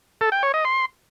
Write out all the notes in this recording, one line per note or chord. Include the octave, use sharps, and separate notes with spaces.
A4
G5
C#5
D#5
C6